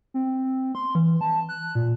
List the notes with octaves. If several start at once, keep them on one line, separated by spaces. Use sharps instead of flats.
C4
C6
E3
A5
F#6
A#2